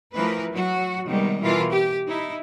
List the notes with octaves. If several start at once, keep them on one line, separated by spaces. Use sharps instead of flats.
E3 F3 A3 A#4 B4
F#3 F#4
C3 D#3 G3 G#3 B3
B2 E3 F4 A#4
G4
D#4 E4